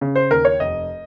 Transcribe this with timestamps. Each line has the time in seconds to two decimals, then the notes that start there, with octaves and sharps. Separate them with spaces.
0.01 C#3
0.15 C5
0.31 D#2 A#4
0.45 C#5
0.60 F1 D#5